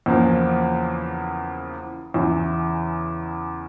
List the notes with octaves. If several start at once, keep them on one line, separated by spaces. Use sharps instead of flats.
E2 C#3 F3 A#3
E2 C#3 E3